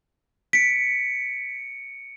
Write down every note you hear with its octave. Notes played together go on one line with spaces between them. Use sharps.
B6 C#7 D7